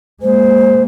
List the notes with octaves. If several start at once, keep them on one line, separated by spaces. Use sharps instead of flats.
G#3 A#3 C5